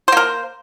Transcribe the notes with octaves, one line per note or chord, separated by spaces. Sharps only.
A#3 A#4 C5